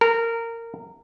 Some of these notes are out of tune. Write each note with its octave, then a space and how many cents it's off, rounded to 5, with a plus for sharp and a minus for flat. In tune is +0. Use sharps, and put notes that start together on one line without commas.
A#4 -20